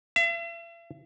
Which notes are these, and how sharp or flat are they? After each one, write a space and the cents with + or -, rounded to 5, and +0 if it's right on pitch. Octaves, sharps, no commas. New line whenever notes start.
E5 +45